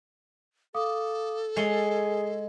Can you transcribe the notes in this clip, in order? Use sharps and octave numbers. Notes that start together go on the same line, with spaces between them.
A4 F5 D6 D#6
G#3 G#4 C#5 C7 G7